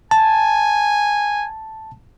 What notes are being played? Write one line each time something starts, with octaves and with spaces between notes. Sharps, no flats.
G#5 A5